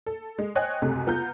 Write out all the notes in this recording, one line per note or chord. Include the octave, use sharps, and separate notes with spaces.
A4
G#3
C5 C#5 D#5 G5 G#5 F#6
C#2 F#2 C3 G#3 A3
B3 F4 A#5 G6